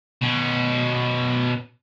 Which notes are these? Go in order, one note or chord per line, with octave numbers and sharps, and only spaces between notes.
B2 C#4